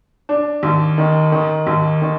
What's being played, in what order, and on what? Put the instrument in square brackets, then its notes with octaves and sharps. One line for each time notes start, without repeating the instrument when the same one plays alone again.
[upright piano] D4
D#2
D#3
D#3
D#2
D#3